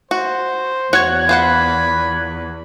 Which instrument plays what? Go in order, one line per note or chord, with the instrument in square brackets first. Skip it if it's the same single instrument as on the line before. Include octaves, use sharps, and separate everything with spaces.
[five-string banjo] F#4 [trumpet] C5
[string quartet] E2 [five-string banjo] F#4 C#5 [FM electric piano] F#6 G#6
[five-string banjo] F4 C5 F#5 [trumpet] B5